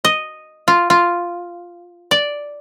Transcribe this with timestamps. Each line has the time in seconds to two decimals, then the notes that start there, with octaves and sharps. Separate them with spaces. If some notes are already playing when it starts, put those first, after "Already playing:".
0.05 D#5
0.68 F4
0.90 F4
2.11 D5